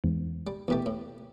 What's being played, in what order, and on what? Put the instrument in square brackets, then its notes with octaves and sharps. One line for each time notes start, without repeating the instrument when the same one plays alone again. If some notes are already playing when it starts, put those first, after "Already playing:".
[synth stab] E2 G#2
[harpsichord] G3
[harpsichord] E2 B2 A3 [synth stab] E3 G4
[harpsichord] A2